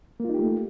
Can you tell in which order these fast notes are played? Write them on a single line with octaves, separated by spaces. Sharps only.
A#3 F4 D#4 G4 A3